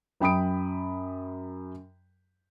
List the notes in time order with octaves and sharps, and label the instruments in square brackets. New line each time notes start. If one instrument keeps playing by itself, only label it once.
[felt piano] F#2 G5 B5 D#6 D7